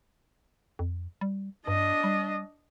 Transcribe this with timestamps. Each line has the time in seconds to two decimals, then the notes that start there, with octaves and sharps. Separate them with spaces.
0.79 F2
1.21 G3
1.67 G2 D4 D#5
2.04 G3